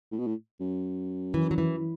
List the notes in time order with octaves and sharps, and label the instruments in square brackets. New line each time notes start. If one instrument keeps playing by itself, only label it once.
[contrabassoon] A2
B2
A2
F#2
[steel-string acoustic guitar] E3
F#3
E3